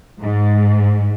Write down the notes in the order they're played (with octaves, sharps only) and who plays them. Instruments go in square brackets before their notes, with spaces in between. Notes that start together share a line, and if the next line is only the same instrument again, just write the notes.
[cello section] G#2